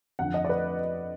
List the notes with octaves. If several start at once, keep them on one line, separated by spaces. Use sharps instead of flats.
F2 D3 F3 F#5
D#5
D5
B4